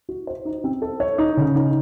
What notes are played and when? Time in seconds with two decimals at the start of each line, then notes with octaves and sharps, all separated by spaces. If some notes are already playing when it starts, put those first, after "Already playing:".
0.09 F#4
0.27 C5
0.45 D#4
0.64 C4
0.82 A4
1.00 C#5
1.18 D#4
1.37 C#3
1.56 D#4